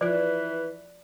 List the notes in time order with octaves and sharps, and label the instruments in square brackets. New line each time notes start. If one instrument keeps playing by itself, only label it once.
[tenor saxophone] E3 [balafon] F3 F4 [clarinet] B4 [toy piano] C5 D5